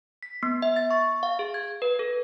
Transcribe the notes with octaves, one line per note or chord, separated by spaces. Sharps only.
B6
B3
E5
A6
C#6
F5
G#4
G#6
B4
A4